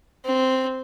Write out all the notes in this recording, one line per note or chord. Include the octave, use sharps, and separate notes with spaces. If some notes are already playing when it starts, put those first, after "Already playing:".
C4